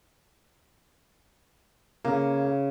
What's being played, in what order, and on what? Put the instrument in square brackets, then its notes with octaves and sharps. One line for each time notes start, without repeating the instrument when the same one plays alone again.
[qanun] C#3 [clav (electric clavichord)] A#3